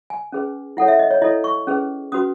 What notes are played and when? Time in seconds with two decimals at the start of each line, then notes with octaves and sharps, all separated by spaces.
0.10 G#5
0.32 C#4 G#4 B4
0.77 E4 A4 C#5 F#5
0.88 E5
0.99 D#5
1.11 C#5
1.22 E4 A4 C#5 D#5
1.44 C#6
1.67 C#4 G#4 B4
2.12 C#4 F#4 B4 D#6